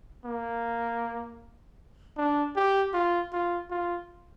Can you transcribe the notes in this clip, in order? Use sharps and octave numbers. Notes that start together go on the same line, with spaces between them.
A#3
D4
G4
F4
F4
F4